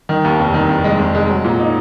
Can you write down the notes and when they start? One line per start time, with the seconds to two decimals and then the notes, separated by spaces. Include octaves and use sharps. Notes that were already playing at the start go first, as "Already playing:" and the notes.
0.09 D#3
0.25 D#2
0.39 F1
0.54 D#3
0.69 F1
0.84 G#3
0.99 F1
1.15 G#3
1.29 F#3
1.45 A#2
1.60 D#4